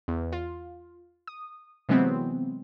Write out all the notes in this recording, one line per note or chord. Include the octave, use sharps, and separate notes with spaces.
E2
F4
D#6
C3 E3 F#3 G#3 B3 C4